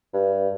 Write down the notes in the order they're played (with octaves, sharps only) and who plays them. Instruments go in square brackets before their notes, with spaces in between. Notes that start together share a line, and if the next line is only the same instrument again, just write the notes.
[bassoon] G2